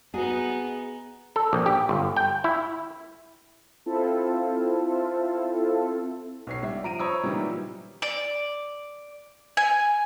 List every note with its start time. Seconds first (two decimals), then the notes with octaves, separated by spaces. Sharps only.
0.14 B3 D#4 F#4 G#4
1.36 A4
1.53 A#1
1.66 G4
1.89 G1
2.16 G5
2.44 E4
3.86 C4 E4 F4 A4
6.47 B1 C#5 C7
6.63 G3 E5
6.83 F3 A#5 D7 D#7
6.99 C5 C#5 A#5 B5 D#6 E6
7.24 A#2 D#3 E3 F#3 G3
8.02 D5
9.57 G#5